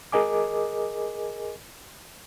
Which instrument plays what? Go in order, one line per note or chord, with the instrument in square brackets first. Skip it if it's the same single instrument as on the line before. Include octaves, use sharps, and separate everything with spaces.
[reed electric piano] G#4 A#4 D#5 G#5 D6